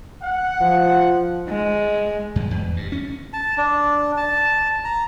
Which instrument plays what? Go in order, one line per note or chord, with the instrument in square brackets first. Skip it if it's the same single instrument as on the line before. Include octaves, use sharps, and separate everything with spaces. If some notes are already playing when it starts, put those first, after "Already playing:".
[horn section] F#5
[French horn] F3
[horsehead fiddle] G#3
[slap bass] F#2
E2
G2
C#4
[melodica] A5
D4
A5
A#5